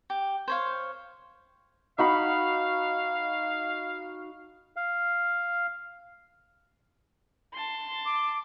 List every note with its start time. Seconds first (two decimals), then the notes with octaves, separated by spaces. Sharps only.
0.10 G4
0.48 C5 C#5 F5
1.98 D#4 F#4 F5 B5
4.76 F5
7.54 A5 C6
8.05 D6